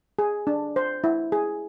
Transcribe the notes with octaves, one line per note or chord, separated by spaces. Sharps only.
G#4
D4
C5
E4
G#4